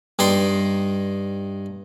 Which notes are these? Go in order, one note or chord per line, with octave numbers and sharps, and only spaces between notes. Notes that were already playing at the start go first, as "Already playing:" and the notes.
G2 D#4 D5 C6